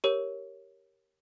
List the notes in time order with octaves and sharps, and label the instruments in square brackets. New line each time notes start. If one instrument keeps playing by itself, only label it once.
[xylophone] G4 A#4 C#5